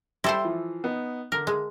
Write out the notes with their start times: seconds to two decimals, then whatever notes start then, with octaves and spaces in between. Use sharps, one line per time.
0.24 G3 E4 A4 C5 G5 C6
0.44 E3 F3
0.84 B3 D#4
1.32 D3 A#4
1.47 G#3